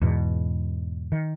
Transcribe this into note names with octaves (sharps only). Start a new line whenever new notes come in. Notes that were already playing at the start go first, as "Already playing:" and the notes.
E2 G#2 B2
D#3